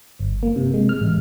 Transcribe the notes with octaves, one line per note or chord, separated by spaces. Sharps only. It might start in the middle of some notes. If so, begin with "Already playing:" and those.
G1
A#3
C3
G#3
F6
A1